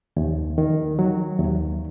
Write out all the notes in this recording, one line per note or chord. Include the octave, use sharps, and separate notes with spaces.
D#2
D#3
F#3
D#2